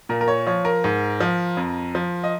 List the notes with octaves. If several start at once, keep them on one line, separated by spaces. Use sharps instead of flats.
A#2 A#4
A#4
C#5
F3 C#5
A#4
G#2
F3
F2
F3
D#5